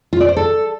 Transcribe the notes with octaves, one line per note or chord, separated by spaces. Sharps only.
F4
D5
C5
A4